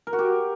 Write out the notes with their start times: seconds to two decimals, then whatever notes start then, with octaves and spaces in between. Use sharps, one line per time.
0.07 A#4
0.13 F#4
0.19 G4